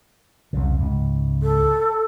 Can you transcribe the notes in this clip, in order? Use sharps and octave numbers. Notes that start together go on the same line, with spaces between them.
C2 F2 C#3
C#2 G#2
A4